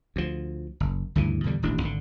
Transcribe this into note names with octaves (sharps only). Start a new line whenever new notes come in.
D2 F3
F#1
D2 G2 C#3 E3
E2 B2 D3 G3
D#1 A1 D4
G#1 D3